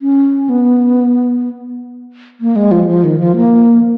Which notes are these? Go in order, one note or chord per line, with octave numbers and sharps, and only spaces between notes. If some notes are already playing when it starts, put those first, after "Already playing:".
C#4
B3
A#3
G#3
F3
F3
D#3
F3
A#3